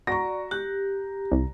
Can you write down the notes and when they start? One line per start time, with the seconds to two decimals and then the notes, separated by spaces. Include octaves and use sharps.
0.07 F#4 D5 A#5 C#6 A#6
0.51 G4 F#6
1.32 C2